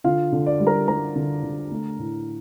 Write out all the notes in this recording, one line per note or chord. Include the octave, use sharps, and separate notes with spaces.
D3 F4 F5
D3
D5
G3
A#4 A#5
G3 A#4 A#5
D3
D3
A3
A2